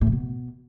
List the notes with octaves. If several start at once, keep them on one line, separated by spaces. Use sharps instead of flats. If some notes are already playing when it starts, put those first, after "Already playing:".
A2
D3
B2